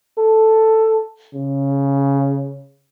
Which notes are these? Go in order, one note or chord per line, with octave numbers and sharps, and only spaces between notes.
A4
C#3